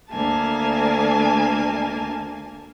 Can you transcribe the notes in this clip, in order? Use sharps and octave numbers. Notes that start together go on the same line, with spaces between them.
D2 A#3 G#5 A5